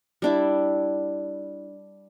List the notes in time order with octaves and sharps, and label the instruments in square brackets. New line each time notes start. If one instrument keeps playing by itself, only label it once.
[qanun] G3 D4 E4